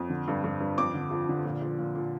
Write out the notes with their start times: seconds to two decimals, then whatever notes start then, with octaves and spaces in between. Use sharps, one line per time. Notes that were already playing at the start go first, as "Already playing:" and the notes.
Already playing: F2
0.10 D3
0.28 G2
0.44 G2
0.60 G2
0.78 F2 D6
0.94 D3
1.11 F3
1.29 D3
1.45 A#2
1.61 F3
1.79 A#2
1.95 A#2